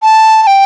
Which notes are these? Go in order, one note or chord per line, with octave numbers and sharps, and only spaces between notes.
A5
A5
G5